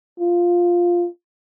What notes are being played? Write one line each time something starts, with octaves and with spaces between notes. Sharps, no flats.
F4